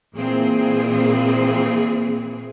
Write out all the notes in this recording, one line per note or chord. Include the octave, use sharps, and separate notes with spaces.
A#2 E3 A#3 C4 G#4